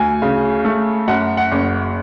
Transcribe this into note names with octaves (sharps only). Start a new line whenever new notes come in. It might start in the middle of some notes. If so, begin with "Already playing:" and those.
Already playing: D2 G#5
C#3
A3
F#2 F#5
F#5
F#1